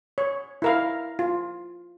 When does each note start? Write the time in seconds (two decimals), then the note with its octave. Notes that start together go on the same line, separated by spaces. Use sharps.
0.18 C#5
0.62 E4 A#4 F5
1.19 F4